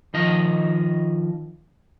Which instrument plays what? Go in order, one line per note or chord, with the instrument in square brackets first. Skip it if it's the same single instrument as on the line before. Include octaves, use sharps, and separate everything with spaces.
[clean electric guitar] D#3 F3 D#5